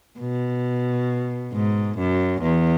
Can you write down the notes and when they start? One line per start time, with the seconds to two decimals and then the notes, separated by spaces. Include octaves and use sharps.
0.20 B2
1.53 G#2
1.98 F#2
2.42 E2